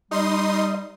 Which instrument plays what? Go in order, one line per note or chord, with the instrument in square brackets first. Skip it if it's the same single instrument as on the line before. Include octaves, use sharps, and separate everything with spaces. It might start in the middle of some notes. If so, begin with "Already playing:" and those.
[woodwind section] G3 [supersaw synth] D#4 C6 D#6 [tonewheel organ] D#5